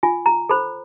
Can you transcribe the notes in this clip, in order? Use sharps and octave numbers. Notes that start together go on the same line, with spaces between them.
F4 G#5
A#5
A4 C5 B5